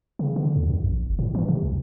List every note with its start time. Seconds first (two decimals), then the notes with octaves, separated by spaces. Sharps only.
0.19 C#3
0.36 D3
0.56 D#2
0.70 F#2
0.82 A#1
1.06 F#1
1.19 A2
1.35 E3
1.48 C3
1.63 C2